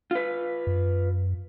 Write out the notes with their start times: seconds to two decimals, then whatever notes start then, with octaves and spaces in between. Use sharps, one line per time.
0.11 F4 B4
0.67 F#2